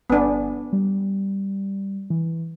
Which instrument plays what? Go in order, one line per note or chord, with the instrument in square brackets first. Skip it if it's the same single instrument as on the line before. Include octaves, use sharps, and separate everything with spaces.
[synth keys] G1 G#5 [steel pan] B3 D4
[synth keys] G3
E3